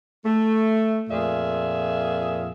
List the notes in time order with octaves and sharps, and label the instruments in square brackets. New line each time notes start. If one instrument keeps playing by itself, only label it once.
[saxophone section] A3
F2 A#2 G#4 E5 F5